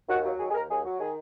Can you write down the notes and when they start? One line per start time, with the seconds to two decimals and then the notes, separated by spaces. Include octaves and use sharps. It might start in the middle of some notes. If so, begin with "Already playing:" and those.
0.08 D#2 F#4
0.24 F#3
0.38 D#3 G#4
0.49 G#4
0.53 D#2 A#4
0.69 D#2 G#4
0.85 F#3
0.99 D#3 G#4